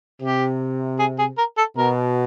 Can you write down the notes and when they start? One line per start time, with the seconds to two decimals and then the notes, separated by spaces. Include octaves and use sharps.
0.22 C3 G4
0.99 G#4
1.19 G#4
1.38 A#4
1.57 A4
1.77 B2 A#4